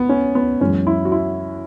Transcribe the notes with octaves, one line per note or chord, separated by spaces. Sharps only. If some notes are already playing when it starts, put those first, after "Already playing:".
Already playing: B3
C#4
B3
F#2 E3 G#3 C#4
E4
F#4
E4